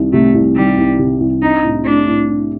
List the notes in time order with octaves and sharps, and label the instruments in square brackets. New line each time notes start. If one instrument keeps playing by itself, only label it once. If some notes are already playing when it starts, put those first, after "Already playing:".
Already playing: [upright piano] C2 D#3
[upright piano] C3 [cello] A3
[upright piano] C2
[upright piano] D#3 [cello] G3
[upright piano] C2
C3
C2
[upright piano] D4 [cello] D#4
[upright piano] A2
[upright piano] A3 [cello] D4
[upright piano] A2
D4